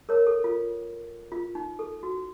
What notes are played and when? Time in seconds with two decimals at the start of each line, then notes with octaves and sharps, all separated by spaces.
0.09 A#4 C#5
0.27 A4
0.44 F4
1.32 F4
1.55 D#4
1.79 A4
2.03 F#4